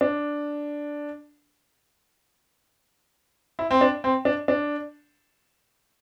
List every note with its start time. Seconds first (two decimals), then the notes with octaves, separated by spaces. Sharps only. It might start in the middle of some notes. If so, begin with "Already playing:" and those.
0.01 D4
3.59 E4
3.71 C4
3.81 D4
4.04 C4
4.25 D4
4.48 D4